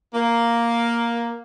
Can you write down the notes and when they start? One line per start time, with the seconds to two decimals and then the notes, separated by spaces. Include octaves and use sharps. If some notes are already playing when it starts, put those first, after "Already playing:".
0.13 A#3